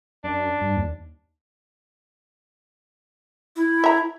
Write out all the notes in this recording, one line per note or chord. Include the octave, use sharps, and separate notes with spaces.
F#2 D4
G2
D#2
E4
E5 A#5